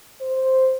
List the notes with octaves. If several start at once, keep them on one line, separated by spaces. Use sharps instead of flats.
C5